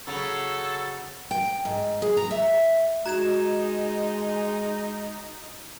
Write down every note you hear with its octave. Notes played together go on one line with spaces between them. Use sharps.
C#3 F#3 A4
G5
G#2
G#4
A#5
E5
G#3 D#4 F#4 A#5 G#6 E7